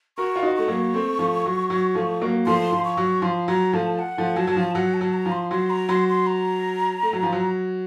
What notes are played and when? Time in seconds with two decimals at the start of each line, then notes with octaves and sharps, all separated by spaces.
0.18 F#4 A#4 C#6
0.36 F4
0.43 D#4 F#4
0.56 A3 C#6
0.68 F#3 A#3
0.94 A3 C4
1.19 F3 A3
1.45 F#3
1.70 F#3
1.95 F3 A3
2.21 F#3 A#3
2.46 F3 A3 C6
2.72 F3
2.85 C#6
2.97 F#3
3.22 F3 C6
3.48 F#3 A#5
3.73 F3 A3 A5
3.99 F#5
4.17 F3 A3
4.36 F#3 A5
4.47 F#3
4.56 F3
4.75 F#3 F#5
4.94 A5
5.01 F#3
5.13 A#5
5.26 F3
5.32 C6
5.51 F#3 C6
5.70 A#5
5.89 F#3 C6
6.08 C6
6.27 A#5
7.03 A3
7.13 F#3
7.23 F3
7.32 F#3